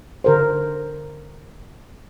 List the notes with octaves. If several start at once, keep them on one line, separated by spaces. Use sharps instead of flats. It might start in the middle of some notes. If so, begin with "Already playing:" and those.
D3 A#4 C5